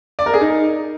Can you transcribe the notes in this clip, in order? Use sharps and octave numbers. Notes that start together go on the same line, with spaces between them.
D5
A#4
G#4
D#4